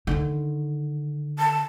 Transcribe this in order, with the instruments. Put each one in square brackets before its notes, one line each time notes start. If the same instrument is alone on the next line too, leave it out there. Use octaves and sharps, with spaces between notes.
[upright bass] D3 D#3
[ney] A5